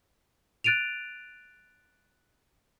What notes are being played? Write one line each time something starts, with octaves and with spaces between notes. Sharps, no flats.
F#6 A6 D7 D#7 F7